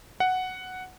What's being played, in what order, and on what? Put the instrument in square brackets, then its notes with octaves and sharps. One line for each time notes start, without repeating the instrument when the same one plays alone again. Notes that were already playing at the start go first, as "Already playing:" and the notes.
[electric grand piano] F#5